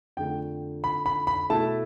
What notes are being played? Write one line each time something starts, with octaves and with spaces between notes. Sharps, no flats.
F2 D3 A3 G5
B5
B5
B5
B2 A3 E4 A5